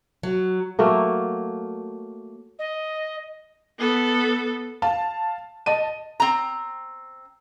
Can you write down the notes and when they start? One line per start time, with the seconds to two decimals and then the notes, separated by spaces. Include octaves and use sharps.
0.23 F#3
0.79 F#3 A3 A#3
2.59 D#5
3.78 B3 A4
4.82 F5 A5
5.66 D#5 A5 D#7
6.20 C4 A#5